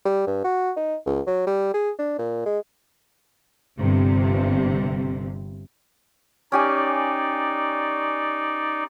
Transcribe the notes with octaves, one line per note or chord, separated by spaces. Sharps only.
G3
G2
F#4
D#4
C#2
F#3
G3
G#4
D4
A#2
G#3
G1 G2 C3
C#4 D#4 G4 D5 G#5